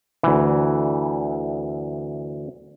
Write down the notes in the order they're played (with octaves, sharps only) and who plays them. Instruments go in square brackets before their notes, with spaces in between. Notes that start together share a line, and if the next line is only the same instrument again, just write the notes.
[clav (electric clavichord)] D2 E3